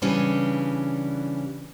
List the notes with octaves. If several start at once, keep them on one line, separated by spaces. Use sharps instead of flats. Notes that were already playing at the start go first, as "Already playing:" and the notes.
C#3 E3 G3 C#4 D4